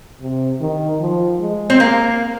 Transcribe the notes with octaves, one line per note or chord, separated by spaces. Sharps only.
C3
D#3
F3
G#3
C4
A#3